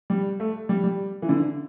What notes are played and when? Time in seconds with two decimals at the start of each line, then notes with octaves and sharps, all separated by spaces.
0.10 G3
0.40 A3
0.69 G3
0.84 G3
1.22 E3
1.29 D3